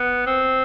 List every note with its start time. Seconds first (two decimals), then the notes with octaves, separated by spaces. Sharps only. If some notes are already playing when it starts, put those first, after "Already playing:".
Already playing: B3
0.27 C4